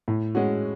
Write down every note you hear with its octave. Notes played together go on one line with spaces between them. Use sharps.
A2
G#3 C#4 F#4